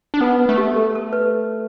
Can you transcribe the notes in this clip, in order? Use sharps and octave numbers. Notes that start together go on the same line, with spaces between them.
D4
B3 B4
B4
A3
G4
A4
A4
B4